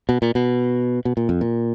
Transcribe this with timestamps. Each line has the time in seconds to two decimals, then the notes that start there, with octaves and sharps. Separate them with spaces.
0.09 B2
0.22 A#2
0.35 B2
1.05 B2
1.17 A#2
1.29 F2
1.41 A#2